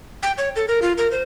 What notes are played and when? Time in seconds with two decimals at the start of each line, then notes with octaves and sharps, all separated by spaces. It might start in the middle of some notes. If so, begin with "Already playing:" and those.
0.23 G5
0.38 C#5
0.56 A4
0.68 A#4
0.82 F4
0.98 A#4
1.11 C5